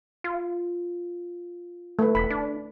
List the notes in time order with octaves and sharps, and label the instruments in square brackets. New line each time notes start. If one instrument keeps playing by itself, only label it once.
[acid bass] F4
[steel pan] A3 B4
[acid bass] E1 [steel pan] B5
[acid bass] D4